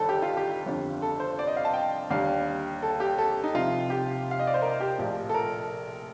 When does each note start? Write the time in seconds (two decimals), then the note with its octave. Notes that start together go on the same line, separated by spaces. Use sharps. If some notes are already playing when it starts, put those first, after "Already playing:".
Already playing: G1 G2 D#3 A4
0.09 G4
0.22 F4
0.37 G4
0.66 G1 F2 D3 G3
1.02 A4
1.20 C5
1.39 D5
1.47 D#5
1.57 F5
1.65 A5
1.74 G5
2.10 D#2 D3 G3 F5
2.83 A4
3.00 G4
3.19 A4
3.44 D#4
3.54 C2 C3 F3 F4
3.90 G4
4.31 F5
4.39 D#5
4.47 D5
4.54 C5
4.62 A#4
4.80 G4
4.98 A#1 A2 F3
5.29 A4
5.34 A#4